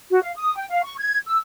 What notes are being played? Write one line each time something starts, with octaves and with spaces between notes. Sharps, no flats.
F#4
F5
D#6
G5
F5
C#6
G#6
E6